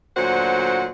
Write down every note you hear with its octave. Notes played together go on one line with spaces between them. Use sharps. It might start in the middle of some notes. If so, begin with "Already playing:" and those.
D2 A#2 F#3 F#4 C5 F#5